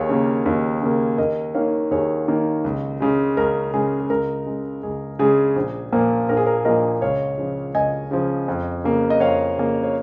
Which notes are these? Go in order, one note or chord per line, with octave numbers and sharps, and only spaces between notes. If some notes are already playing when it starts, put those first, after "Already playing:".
Already playing: D#2 G#4 C#5
C#3 A#3
D#2
C#3 A#3
D#2 A#4 D#5
D#3 A#3 C#5 F5
D#2 G#4 C#5
D#3 A#3
C#2
C#3 G#3
C#2 A#4
C#3 G#3 G#4
G#4
C#2 A#4
C#3 G#3
C#2 G#4
C#3 G#3 G#4
A#1
A#2 F3 A#3
A#1 A#4
G#4
A#4
A#2 F3 A#3 A#4 D#5
C#2 C#5 F5
C#3 F3
C#2 D#5 G#5
C#3 F3
F2
C#3 A#3
D#5
F2 C#5 F5
C#3 A#3
C#5